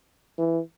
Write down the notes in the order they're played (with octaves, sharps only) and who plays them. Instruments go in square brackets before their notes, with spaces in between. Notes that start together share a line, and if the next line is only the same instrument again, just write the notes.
[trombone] E3